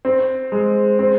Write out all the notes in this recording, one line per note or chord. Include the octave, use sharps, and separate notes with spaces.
C4
G#3
C4